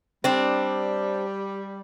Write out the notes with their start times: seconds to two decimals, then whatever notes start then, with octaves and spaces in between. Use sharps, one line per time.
0.24 G3 C4 D4